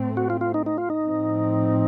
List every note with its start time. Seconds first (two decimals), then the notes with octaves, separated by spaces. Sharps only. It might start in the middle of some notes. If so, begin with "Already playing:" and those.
Already playing: A2 A3 C4
0.17 F#4
0.30 F4
0.41 F4
0.54 D#4
0.66 D#4
0.78 F4
0.90 D#4
1.03 A2 F3 C4